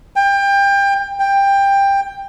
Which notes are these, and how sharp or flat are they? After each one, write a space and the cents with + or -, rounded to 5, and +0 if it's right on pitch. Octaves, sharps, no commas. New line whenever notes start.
G5 +25
G5 +15